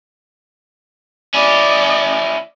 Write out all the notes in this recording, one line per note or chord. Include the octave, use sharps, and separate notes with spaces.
C#4 E4 D5 D#5